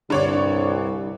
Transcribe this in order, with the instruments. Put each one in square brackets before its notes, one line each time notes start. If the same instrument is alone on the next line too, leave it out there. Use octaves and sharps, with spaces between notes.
[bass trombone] C2 [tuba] G2 [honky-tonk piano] D3 C#5 D5